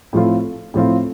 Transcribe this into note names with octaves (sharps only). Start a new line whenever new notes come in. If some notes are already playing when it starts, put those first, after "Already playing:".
A2 F3 A3 C4 F4
A2 F3 A3 C4 F4